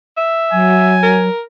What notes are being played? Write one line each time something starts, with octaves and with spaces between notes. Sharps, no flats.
E5
F#3 G#5
A#4